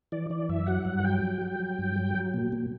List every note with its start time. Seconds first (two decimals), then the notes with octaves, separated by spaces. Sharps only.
0.12 E3 D5
0.30 E3 D5
0.49 F#2 E5
0.67 F#3 F#5
0.85 G2
1.04 F#3 G5
1.22 F#3
1.42 F#3
1.60 F#3
1.78 G2
1.96 F#3
2.15 F#3
2.34 A#2
2.52 A#2